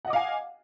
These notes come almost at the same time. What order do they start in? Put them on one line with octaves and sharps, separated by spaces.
F#5 D#5 D6 F5 G#5